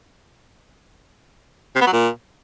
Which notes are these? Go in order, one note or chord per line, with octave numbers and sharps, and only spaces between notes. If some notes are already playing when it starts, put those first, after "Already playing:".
C3
B3
F#3
A#2